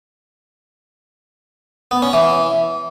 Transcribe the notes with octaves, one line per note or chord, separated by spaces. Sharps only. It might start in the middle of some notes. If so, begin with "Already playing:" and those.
B3
C#4
E3